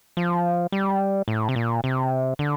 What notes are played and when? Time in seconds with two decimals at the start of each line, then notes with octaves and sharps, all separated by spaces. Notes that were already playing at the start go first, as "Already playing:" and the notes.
0.17 F3
0.72 G3
1.28 A2
1.49 C3
1.56 A#2
1.84 C3
2.39 D3